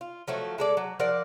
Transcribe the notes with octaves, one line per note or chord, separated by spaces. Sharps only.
F4
F3 F#3 A3
G#3 A4 D5
F#3
F3 A#4 D5 F#5